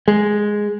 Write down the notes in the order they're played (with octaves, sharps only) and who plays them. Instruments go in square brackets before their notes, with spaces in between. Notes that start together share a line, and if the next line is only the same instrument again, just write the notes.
[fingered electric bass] G#3